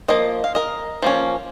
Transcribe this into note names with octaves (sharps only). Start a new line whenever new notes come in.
F3 A#3 D#5
F5
A#4 D#5
F3 A#3 C#4